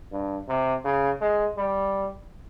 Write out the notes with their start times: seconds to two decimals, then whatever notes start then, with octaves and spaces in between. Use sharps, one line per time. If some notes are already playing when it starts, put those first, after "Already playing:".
0.12 G2
0.48 C3
0.85 C#3
1.21 G#3
1.57 G3